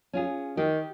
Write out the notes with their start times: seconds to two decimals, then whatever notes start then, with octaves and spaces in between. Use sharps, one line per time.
0.13 C#4 F4 G#4
0.57 D#3 G4